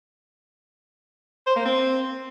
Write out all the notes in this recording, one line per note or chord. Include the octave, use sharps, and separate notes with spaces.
C5
A#3
C4